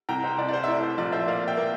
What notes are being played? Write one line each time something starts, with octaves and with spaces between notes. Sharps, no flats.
C2 G5 A#5
C5
C2 D5
D5
C5
E5
A2 D5
C5
A#1 D5
C5 E5
A#3 D5 F5
E5 G5
A#3